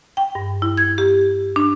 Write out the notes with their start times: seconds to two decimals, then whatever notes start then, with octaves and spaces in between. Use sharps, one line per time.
0.17 G5
0.35 G2
0.62 E4
0.78 G#6
0.98 G4
1.56 D4